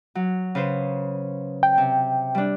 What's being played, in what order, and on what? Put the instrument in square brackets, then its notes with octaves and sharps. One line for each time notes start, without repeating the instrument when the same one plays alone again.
[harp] F#3
C#3 B4 C5
[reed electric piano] G5
[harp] C3
G3 D4